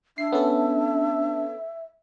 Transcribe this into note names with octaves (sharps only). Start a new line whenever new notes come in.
D4 E5 C7
B3 C#4 A4